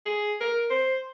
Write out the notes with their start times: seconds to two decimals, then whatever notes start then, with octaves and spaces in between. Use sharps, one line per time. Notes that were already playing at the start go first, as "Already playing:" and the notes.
0.06 G#4
0.41 A#4
0.70 C5